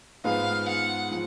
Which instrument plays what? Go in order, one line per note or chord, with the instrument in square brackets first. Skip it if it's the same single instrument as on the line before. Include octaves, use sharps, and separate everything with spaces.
[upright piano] G#2 F3 B3 D#4 G#4 [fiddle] F5
[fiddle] F#5
[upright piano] F3